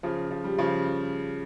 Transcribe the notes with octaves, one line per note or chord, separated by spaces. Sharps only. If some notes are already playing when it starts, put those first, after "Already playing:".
C#3 F3
F3
G3
C#3 F3